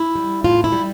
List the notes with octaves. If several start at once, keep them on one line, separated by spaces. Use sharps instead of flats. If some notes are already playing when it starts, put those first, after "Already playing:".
Already playing: E4
G3
A2 F4
E4
G3